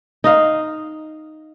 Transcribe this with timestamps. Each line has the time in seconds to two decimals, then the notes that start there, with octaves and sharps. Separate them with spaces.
0.24 D#4 D#5 F5